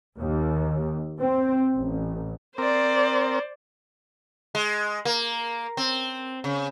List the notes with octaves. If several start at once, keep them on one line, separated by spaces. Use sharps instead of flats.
D#2
C4
A1
C4 A#4 C5 D5
G#3
A#3
C4
C#3